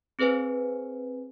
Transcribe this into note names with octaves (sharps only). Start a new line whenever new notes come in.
C4 G#4 B4 C5 G#5